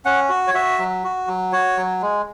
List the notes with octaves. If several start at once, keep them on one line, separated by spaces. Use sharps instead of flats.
C#4 F#5
F#4
C#5
F#4 E5
F#3
F#4
F#3
F#4 C#5
F#3
G#3